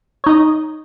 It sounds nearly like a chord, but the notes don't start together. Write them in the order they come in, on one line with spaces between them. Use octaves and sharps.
C#5 D#4 D#5